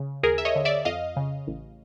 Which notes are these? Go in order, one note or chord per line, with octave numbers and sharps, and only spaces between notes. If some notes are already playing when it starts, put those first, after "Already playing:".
Already playing: C#3
D#2 G#4 A#4
E5
C#5 D#5
D3
D5 E5
F2 D#5 F5
C#3
A1